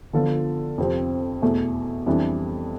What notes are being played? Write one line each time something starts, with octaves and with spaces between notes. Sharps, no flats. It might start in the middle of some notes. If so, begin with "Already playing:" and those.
D3 F3 B3 F4 A4
F2 C3 F3 C4 G4
E2 B2 A3
F2 E3 G3 D4